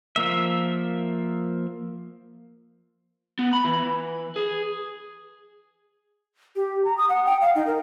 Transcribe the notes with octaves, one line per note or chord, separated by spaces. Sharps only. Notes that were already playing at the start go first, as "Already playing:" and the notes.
F3 A#3 E5
B3
B5
E3
G#4
G4
A#5
D#6
F#5
G5
F5
D#4
A#4